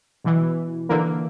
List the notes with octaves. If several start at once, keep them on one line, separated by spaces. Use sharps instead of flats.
B2 E3
D3 E3 A#3